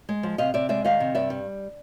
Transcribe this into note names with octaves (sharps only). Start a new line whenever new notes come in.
G#3
F3
C3 D#5 F5
C3 D5 E5
G#3 D5 E5
D#3 D#5 F5
C3
G2 D5 E5
G3